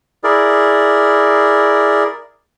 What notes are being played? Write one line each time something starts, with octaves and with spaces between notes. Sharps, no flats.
E4 G#4 A#4 D5